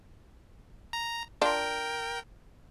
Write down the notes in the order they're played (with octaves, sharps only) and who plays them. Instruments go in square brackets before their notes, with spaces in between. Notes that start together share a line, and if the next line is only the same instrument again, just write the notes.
[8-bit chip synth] A#5
[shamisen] D4 F4 [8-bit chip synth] A#4 G5